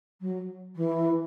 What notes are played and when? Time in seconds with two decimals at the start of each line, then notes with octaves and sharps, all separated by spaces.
0.21 F#3
0.76 E3